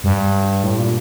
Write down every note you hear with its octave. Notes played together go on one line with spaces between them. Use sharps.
G2
A2
A#2